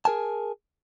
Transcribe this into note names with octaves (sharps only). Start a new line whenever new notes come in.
G#4 A#4 G#5 A5